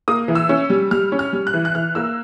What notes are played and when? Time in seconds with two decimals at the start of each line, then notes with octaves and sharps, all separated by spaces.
0.08 A#3 D#6
0.28 E3
0.35 E6
0.49 C#4
0.70 G3
0.91 G3 F6
1.12 C#4
1.19 F6
1.33 G3
1.47 F#6
1.54 E3
1.65 F#6
1.75 E3 F6
1.95 A#3 E6